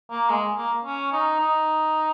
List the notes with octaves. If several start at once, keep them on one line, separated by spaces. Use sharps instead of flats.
A#3
G#3
A#3
C#4
D#4
D#4